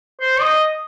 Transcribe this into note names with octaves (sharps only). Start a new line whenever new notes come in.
C5
D#5